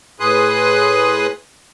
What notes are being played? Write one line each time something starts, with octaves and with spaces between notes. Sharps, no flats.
A2 G#4 B4 C6 D#6 F#6